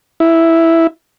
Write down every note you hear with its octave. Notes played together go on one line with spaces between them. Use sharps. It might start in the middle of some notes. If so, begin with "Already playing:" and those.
E4